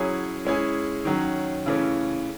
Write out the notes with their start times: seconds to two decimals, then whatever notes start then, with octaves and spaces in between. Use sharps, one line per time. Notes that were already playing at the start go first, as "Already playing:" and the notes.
Already playing: F#3 C#4 E4 G#4
0.45 G#3 C#4 E4 G#4
1.05 D#3 F#3 C#4
1.66 C#3 E3 A3 C#4